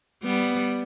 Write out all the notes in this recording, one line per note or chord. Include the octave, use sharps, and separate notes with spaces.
G3 B3